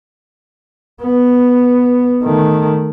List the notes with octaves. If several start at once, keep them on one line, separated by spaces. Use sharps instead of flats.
B3
D#3 A3